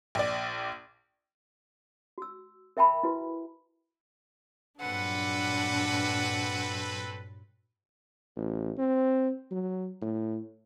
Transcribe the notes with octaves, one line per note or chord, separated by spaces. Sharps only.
A#1 D5
F#4 E6
A#4 E5 G5 A5 B5
E4 F#4 B4
G2 A#2 F#3 C4 D4 A4 B4 F#5
A1
C4
F#3
A2